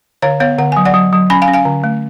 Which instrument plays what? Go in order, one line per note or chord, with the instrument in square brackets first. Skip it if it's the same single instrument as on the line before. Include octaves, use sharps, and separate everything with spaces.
[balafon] D3 C#5 F5
B3 C#5 F5
D3 F#5
F#3 G#5
D5 F#5
F#3
F#3
C#4 G#5 B5
F5 G#5
C#4
F5 G#5
D3
A3